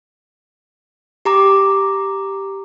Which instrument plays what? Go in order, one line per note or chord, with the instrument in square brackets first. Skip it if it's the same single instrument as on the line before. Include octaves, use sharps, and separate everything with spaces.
[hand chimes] G4 A#5 D6